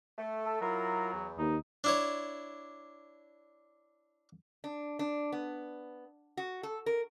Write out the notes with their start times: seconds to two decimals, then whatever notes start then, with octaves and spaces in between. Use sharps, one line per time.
0.17 A3
0.46 A4
0.61 F#3 E4 F4 A#4
1.12 E2
1.39 D#2 D#4
1.84 D4 E4 C#5
4.64 D4
4.99 D4
5.32 B3
6.37 F#4
6.63 A4
6.86 A#4